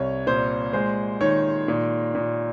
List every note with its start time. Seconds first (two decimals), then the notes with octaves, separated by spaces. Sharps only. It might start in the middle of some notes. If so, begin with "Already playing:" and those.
Already playing: C2 C#5
0.27 A#2 C5
0.73 G#3 C5
1.20 D#3 C#5
1.68 A#2
2.15 A#2